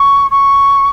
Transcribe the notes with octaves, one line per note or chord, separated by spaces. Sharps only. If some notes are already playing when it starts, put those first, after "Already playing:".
Already playing: C#6
C#6